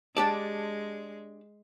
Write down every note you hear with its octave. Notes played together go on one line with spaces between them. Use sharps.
G#3 D4 G4 D5 A5